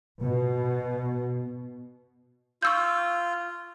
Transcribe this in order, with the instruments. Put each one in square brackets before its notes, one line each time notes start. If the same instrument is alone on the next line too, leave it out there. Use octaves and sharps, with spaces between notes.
[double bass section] B2
[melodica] F4 [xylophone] C#6 E6 G6